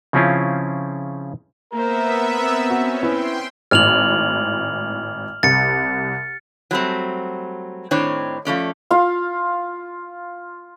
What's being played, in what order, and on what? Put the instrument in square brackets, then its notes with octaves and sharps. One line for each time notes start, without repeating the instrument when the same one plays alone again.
[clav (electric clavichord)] C#3 F3 C4 C#4 E4 F4
[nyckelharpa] A#3 C5 [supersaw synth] B3 E5 [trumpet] A#4
[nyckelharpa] C4
[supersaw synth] C#4 [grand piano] F#4
[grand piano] B3 E4 [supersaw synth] G5 C6
[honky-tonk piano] G#1 A2 [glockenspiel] F6 F7 F#7
[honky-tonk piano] C2 [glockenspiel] A6 C#7
[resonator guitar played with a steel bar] F#3 G3 A3 C4
A2 D#3 C4 D4 C#5
F3 A3 C#4 D5
[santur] F4 F5